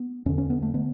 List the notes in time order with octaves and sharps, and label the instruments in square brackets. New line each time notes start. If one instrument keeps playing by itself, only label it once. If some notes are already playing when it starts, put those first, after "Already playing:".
Already playing: [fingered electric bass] B3
E2 D3 C#4
C#4
B3
A3
D3 B3